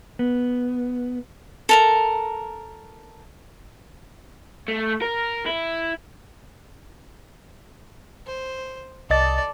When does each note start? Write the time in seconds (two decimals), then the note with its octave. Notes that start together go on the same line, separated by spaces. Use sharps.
0.19 B3
1.69 A4 A#4 A#5
4.68 A3
5.02 A#4
5.46 E4
8.27 C5
9.10 C2 A4 D5 D#5 A6